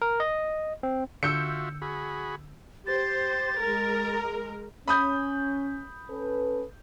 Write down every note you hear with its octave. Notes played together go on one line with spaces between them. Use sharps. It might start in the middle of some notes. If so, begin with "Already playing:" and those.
A#4
D#5
C4
D3 F4 F#4 E5 E6 G6 C#7
F#4 G#4 B5
G4 C5 A6
G#3 A#4
C#4 B5 D#6 G6
C#4 A4 B4